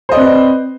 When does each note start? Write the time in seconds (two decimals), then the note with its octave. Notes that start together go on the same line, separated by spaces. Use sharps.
0.09 C5
0.12 D#5
0.14 D5
0.17 C4
0.19 B4